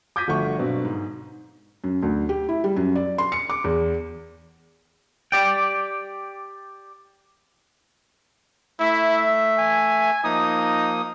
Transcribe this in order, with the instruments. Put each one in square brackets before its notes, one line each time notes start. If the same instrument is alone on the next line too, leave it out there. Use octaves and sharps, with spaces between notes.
[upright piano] D6 G6 G#6 A#6 B6 D#7
G1 F3 A3 F#4 F#5 C#6
G2 B2 F#3 C4
G#2
[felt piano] F#2
D2
G4
E4
G3
F#2
D5
C6
C#7
D6
E2
[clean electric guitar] G4 D5 G5
[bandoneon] A3 E5 [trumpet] E4
[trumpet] G#5
[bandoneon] F3 A#3 D#6 [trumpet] D#4